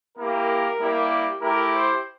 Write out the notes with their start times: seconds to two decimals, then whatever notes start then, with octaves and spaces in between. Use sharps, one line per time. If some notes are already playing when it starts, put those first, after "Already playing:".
0.17 A#3 E4 G4 A#4
0.79 G3 A#3 E4 G4
1.41 A3 E4 G4 A#4
1.73 C5